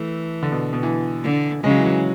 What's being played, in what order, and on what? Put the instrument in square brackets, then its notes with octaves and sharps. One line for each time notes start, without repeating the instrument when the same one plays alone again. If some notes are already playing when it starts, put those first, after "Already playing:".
Already playing: [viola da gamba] E3 [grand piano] A3
[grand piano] D3
B2
B2
E3
[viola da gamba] D3
[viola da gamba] C#3 [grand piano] G#3
[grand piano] F#3
E3
F#3